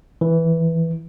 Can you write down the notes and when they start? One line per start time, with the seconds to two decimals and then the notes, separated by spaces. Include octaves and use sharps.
0.21 E3